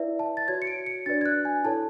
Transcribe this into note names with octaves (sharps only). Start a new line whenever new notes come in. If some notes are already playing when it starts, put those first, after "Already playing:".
Already playing: E4 B4 D5 E5
A5
A6
F#4 C#5 G#6
C#7
D7
C#7
D4 F#4 B4 D5 A6
G#6
F#6
G#5
E4 A4 C#5 A5